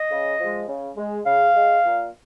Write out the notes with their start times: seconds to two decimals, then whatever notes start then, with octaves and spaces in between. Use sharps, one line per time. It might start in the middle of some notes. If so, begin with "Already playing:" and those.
Already playing: D#5
0.11 C#3
0.39 F3 G#3
0.67 C#3
0.97 G#3
1.26 C#3 F5
1.55 G#3
1.85 A#2